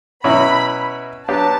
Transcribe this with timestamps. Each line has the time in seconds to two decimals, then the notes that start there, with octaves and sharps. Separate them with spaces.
0.24 B2 F#3 C#4 E4 B5
1.28 F#3 B3 D4 G4 A5